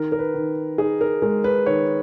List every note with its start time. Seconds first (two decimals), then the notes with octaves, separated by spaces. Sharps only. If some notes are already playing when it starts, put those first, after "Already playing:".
Already playing: D#3 A#4
0.12 A#4
0.19 B4
0.34 D#3
0.78 D#4 G#4
1.01 A#4
1.22 G#3 A#4
1.44 B4
1.66 D#3 C#5